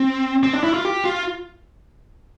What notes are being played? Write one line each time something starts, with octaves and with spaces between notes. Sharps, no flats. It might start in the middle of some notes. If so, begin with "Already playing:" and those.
Already playing: C4
C4
D4
E4
F4
G4
F4